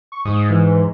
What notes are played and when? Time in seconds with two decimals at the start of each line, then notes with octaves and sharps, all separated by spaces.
0.12 C#6
0.25 G#2 D#6
0.50 E3